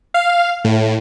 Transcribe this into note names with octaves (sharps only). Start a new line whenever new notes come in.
F5
A2